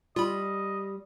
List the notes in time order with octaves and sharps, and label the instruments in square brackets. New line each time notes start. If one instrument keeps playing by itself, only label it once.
[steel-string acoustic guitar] G3 [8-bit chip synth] F4 B5 [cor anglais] D#5